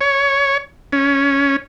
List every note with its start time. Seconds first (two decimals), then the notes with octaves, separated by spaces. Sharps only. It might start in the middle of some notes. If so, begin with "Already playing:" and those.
0.01 C#5
0.92 C#4